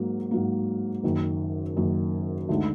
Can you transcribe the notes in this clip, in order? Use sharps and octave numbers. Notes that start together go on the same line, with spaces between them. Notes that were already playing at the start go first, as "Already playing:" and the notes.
Already playing: G#2 F#3 A#3
G#2 F#3 A#3
F#1 F#2 D#3
F#1 F#2 D#3
D2 D3 G#3 D#4